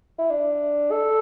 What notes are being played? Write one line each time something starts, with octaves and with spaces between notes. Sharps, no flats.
E4
D4
A4